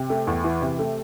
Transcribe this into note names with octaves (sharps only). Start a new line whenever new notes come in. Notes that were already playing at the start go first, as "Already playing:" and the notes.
Already playing: C3
A3
E2
E3
C3
A3